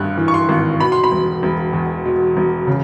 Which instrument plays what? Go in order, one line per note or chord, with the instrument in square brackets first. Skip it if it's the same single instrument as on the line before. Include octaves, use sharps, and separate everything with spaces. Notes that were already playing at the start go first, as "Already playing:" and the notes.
Already playing: [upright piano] G#1 G2 G3 F#6
E3
C#6
C6
G#1
B2 B5
C6
B5
E1
E1
E2
B2
E1
C#3